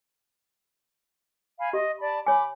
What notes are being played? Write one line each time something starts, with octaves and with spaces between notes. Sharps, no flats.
F5 G#5 B5
G4 D#5 E5
D5 A5 B5
C#5 G#5 B5 D6